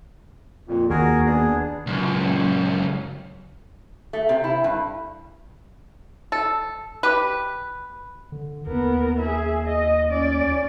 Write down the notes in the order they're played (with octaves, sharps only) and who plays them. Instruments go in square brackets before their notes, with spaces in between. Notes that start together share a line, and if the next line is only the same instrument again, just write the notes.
[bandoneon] F2 A#2
[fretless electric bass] D#2 [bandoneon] F#4 G#4 A#4
[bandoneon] B3 D4 G#4
[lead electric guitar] C#2 F#2
[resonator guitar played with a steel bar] A3
C3
E4
G2
[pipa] A4
G4 B4
[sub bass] D3
[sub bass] D#2 [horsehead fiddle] B3 A#4
[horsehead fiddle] G#4 E5
D#5
C#4 D5